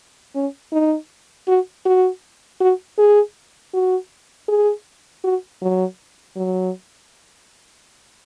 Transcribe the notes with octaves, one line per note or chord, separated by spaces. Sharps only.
C#4
D#4
F#4
F#4
F#4
G#4
F#4
G#4
F#4
F#3
F#3